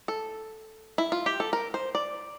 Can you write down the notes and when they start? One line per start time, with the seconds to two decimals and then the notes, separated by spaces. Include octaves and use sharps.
0.08 A4
0.98 E4
1.12 F4
1.26 G4
1.40 A4
1.53 A#4
1.74 C5
1.95 D5